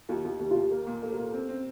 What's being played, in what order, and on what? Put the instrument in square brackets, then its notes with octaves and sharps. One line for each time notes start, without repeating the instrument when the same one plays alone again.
[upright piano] D#2 [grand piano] F4
[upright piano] D#2 [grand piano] F4
[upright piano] D#2 [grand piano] G4
[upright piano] D#2 [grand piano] F4
[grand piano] G4
[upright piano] A#3
A#2
[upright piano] A#3 [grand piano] A4
[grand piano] A#4
[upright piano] A#2
[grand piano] A4
[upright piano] C4
C4